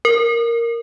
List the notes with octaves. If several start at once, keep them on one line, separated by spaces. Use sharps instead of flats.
A#4